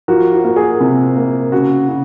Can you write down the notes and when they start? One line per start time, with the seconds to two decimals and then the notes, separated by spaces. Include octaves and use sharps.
0.08 F3 F#4 A#4
0.33 F#4
0.44 A#3
0.56 G#4
0.80 C3
1.17 A#3
1.52 C#3 F#4
1.89 C#3